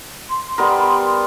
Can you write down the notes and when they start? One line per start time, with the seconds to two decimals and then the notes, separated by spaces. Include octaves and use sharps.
0.29 C6
0.58 G3 B3 A#4